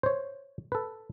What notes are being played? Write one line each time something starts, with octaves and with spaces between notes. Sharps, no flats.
C5 C#5
A4 B4